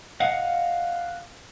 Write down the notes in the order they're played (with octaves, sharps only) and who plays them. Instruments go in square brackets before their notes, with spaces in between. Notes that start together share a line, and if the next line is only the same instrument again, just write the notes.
[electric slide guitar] D#5 F5 F#5